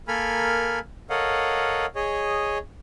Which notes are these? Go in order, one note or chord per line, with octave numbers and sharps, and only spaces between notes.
A#3 A4 A#4 G#5 B5 F6
A4 A#4 C#5 D#5 F5 F#5
G#4 C#5 D#5